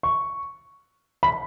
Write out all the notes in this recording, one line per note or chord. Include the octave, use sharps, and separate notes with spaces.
C#6
B5